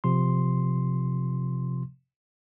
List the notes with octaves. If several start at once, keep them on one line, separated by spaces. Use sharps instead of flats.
C3 F3 C6